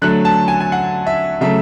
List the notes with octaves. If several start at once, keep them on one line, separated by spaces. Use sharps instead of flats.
D3 F#3 A3 F#6
A5
G#5
G#5
F#5
E5
C#3 F#3 A3 E5